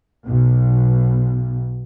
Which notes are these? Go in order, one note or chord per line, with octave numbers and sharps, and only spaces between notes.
B1 B2